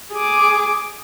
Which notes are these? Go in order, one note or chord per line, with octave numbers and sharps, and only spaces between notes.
G#4 D6